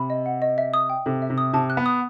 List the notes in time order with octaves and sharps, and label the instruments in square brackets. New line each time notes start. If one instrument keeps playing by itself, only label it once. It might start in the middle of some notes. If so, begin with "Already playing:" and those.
Already playing: [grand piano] C3 [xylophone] B5
[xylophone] D#5
F#5
D#5
E5
D#6
G5
[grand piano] C3 [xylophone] A4
[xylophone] E5
[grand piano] C3
[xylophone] D#6
[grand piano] C3 [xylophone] A5
[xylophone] F#6
[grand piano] B3
[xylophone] D#6